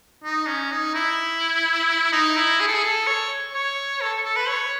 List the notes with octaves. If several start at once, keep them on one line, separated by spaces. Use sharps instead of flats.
D#4
C#4
D#4
E4
D#4
E4
G#4
A4
G#4
A4
C#5
C#5
A4
A4
B4
C#5